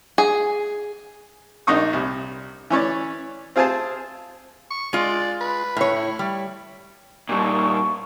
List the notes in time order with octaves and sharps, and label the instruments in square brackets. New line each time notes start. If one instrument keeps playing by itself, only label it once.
[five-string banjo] G#4
[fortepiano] A#1 A#3 D4 D#4 C#6 D#6
C2
E3 C#4 C#5 D5
C4 F4 G#4 C5 G#5 A5
[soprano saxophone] C#6
[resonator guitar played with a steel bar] G#3 F4 [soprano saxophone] D5
[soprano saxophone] B4
[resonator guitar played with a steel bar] A2 C#5
[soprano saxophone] E4
[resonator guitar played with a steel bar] G3
[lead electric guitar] A#2 G3 [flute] C#6